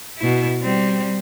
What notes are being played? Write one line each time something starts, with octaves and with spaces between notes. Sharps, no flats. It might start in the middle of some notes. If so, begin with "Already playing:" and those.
B2 E4
G3 C4